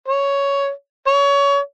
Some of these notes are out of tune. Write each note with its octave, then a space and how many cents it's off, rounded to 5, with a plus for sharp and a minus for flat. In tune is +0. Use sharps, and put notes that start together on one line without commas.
C#5 +10
C#5 +25